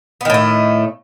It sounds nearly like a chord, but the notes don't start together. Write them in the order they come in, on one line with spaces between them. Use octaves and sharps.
B3 D#3 A2 A3